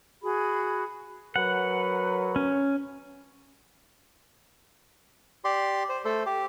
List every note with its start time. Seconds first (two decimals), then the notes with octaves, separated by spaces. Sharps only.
0.22 F#4 G#4 B5
1.36 F#3 A#4 B4 F#5
2.36 C#4
5.44 G4 D5 C6
5.89 C5
6.05 A3 A4 C5
6.26 G4